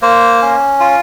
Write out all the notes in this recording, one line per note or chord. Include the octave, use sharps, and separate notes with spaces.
A#3 C5
C#4
F4